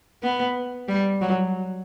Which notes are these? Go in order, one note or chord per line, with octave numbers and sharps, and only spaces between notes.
B3
G3
F#3